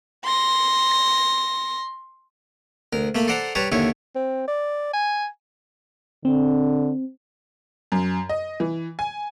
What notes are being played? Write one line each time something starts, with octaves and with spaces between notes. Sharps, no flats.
C6 A#6
D2 A#4
A3 A#3 B5
A4 C5 D5 F#5 A#5
G3 B4 C#5 A5 A#5
D#2 D3 E4 C#5
C4
D5
G#5
D3 C4
F#2
D#5
E3
G#5